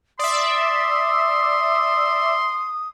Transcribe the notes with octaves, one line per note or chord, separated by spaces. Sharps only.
D5 E5 C6 D#6